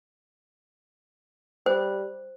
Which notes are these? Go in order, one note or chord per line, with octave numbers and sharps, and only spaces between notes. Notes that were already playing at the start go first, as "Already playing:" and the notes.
G3 C5